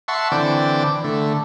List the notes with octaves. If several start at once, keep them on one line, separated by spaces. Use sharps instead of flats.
E5 F#5 A5 C6 C#6
D3 E3 C4 D5 G5
D3 A3